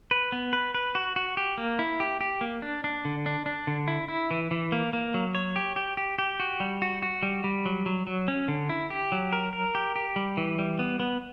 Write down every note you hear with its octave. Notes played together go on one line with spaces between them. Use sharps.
B4
B3
B4
B4
F#4
F#4
G4
A#3
E4
G4
G4
A#3
D4
D4
D3
D4
D4
D3
E4
E4
E3
E3
A#3
A#3
F#3
C#5
G4
G4
G4
G4
F#4
G3
F#4
F#4
G3
G3
F#3
F#3
F#3
C#4
D3
E4
G4
F#3
A#4
A#4
G4
G4
G3
E3
G3
B3
B3